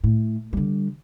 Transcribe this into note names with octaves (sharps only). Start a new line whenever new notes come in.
A2
D3 G3